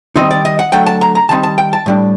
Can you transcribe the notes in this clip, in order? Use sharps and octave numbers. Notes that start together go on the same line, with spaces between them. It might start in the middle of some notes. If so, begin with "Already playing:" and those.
D#3 G3 C4 D#4 D#5
D5
D#5
F#5
D3 F#3 A3 G5
A5
A#5
A#5
D#3 G3 C4 D#4 A5
A5
G5
A5
A2 G3 D4